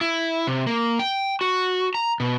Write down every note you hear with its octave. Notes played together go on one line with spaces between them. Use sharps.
E4
C3
A#3
G5
F#4
A#5
B2